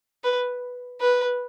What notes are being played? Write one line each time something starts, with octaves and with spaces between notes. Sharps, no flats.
B4
B4